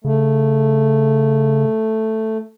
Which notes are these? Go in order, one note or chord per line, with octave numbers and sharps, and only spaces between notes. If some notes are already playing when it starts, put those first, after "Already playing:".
C#3 A3